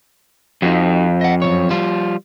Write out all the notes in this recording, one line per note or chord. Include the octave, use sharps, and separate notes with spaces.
F2 D#4 F#4
D#5 F#5
F#2 C#3 C#5
F3 G3 F4